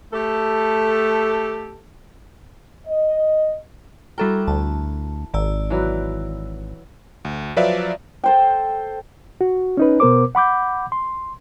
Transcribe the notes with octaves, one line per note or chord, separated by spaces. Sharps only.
A3 G4 A4
D#5
G3 E4 F#4 A4 A#4 G5
D2 A5
G#1 D#3 D5 E6
E3 F#3 B4
D2
F3 F#3 B4 D5 E5 F5
A4 C5 G5
F#4
C#4 D#4 B4
B2 B3 A#4 C5 D6
F#5 B5 D6 G6
C6